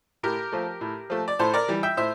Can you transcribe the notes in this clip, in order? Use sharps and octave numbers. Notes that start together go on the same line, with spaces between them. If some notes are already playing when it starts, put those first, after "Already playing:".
A2 G4 A#4
F3 A3
A2
F3 A3
D5
A2 A4 C5
A#4 D5
E3 G3
E5 G5
A2 C5 E5